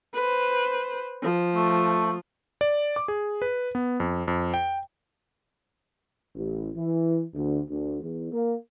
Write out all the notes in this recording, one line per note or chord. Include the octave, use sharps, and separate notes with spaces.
B4 C5
F3
A3
D5
D6
G#4
B4
B3
F2
F2
G5
A1
E3
D2
D2
E2
A#3